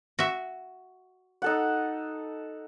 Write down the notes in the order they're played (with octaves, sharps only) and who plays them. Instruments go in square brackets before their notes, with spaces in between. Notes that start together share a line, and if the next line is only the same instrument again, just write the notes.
[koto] F#4 E5
[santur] D#4 A4 F#5